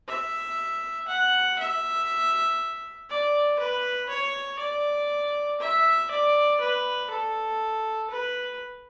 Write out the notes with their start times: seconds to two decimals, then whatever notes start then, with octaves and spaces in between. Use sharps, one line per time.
0.08 E5
1.08 F#5
1.59 E5
3.10 D5
3.59 B4
4.09 C#5
4.60 D5
5.60 E5
6.11 D5
6.61 B4
7.11 A4
8.11 B4